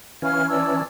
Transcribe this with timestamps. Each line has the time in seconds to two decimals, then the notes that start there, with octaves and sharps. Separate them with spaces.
0.22 E3 C#4 F5 F6
0.48 D5 A5 E6